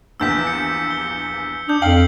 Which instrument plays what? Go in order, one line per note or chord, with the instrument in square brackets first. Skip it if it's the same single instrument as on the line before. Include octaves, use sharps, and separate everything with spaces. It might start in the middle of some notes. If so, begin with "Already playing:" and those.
[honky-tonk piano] A#1 E2 G2 [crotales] E6 G6 B6
[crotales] C#7
G7
[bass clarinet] D4 [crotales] D#6 G6
[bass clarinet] F2 [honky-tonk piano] F5 G5 [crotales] F#7